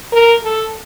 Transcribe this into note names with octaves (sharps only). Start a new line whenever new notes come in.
A#4
A4